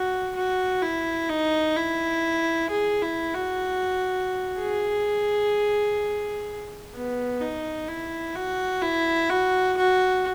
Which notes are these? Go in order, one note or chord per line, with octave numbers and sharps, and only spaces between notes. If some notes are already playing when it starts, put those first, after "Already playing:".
Already playing: F#4
F#4
E4
D#4
E4
G#4
E4
F#4
G#4
B3
D#4
E4
F#4
E4
F#4
F#4